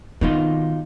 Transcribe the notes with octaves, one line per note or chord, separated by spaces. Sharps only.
B2 D#3 C4 D#4 F4